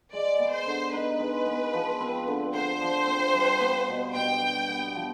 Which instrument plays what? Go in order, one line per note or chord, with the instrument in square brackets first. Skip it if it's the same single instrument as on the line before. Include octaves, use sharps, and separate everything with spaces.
[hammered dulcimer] G#3 [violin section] D5
[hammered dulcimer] B3
[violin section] C5
[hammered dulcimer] D3
[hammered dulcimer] D#4 [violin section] B4
[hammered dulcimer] G#3
B3
F3
C4
D3
[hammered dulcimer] D3 [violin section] C5
[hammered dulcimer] F3
C4
G3
B3
B2
[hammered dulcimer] B2 [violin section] G5
[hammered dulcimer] G3
B3
F3